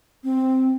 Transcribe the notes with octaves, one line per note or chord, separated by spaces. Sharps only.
C4